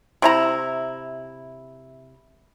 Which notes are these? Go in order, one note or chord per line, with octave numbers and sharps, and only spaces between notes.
C3 E4 A#5